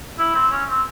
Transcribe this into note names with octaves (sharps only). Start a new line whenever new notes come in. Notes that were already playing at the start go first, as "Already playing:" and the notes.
E4
C4
C#4
C4